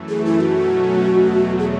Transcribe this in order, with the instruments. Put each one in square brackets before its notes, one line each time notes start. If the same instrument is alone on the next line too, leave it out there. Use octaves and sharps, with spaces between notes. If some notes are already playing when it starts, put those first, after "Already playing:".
Already playing: [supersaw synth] F#2 E3 A3
[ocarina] G#4
E4
[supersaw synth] B2 F#3 A3 C#4 [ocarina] F#4
[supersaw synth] E2 B2 F#3 A3
[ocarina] G#4